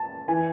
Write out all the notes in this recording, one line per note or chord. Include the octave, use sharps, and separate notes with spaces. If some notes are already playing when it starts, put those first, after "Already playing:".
Already playing: A5
E3 G#5